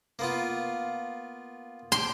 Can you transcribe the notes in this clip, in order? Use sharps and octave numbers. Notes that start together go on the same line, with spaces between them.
A#3 B3 F4
G5 C6 D6